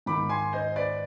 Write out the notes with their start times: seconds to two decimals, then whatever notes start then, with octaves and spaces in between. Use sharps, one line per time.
0.06 G#2 D#3 B5 D6
0.29 G#5 C6
0.53 C5 D#5
0.76 B4 D5